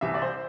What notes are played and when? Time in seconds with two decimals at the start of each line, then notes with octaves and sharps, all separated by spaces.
0.01 C2 C3 E3 E5
0.14 D5
0.22 C5